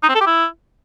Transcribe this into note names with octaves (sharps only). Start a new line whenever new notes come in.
D#4
C4
A4
G4
E4